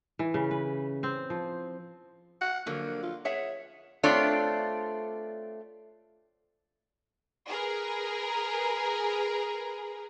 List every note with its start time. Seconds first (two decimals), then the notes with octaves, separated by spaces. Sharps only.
0.19 E3
0.34 C#3
0.51 B4
1.03 C4
1.30 F3
2.41 F#5
2.66 D3 F3 F#3 A#3
3.03 F4
3.25 G#4 C#5 E5 F#5
4.03 A3 C4 D4 F4 C#5 D5
7.48 G#4 A#4 B4